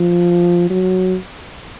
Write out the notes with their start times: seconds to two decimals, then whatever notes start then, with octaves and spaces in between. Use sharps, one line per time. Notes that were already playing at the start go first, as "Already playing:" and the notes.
Already playing: F3
0.70 F#3